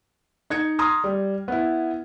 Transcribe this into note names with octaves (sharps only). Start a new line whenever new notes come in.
D#4 G#6 C#7
A#5 C6 D#6 F6 G#6
G3
B3 E4